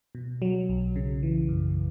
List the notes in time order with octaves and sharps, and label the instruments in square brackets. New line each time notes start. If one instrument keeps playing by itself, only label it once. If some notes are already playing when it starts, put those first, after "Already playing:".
[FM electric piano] B2
F#3
B1
C#3
E3
F#2